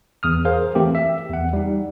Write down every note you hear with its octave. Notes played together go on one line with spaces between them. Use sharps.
E2 D#6 F6
G#4 A#4 C5 F5
E3 A3 C4 G4
E5
E2 F#5
G3 D#4